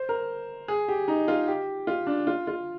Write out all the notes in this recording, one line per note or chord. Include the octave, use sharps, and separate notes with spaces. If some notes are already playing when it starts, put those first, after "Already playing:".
Already playing: C5
A#4
G#4
G4
D#4
F4
G4
F4
D4
F4
F4